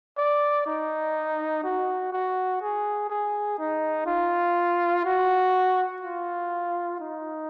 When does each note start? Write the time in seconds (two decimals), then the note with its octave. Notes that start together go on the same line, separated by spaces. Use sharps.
0.18 D5
0.66 D#4
1.63 F#4
2.12 F#4
2.61 G#4
3.10 G#4
3.59 D#4
4.07 F4
5.05 F#4
6.02 F4
7.00 D#4